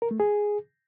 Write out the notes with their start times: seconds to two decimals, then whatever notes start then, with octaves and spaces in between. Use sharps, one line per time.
0.02 A#4
0.11 A3
0.20 G#4